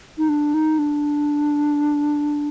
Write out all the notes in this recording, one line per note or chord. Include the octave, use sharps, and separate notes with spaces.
D#4
D4
D#4
D4